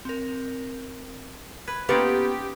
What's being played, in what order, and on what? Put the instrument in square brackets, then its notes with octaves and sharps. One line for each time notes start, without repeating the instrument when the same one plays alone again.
[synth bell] C4 A#4
[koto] B4 [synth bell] G#6
[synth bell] A#3 C#4 [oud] B3 [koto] D#4 F4 D5 [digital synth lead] G4